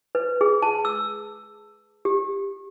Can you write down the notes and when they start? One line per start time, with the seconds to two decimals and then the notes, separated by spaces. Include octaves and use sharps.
0.15 B4
0.41 G#4
0.62 A5
0.85 E6
2.05 G4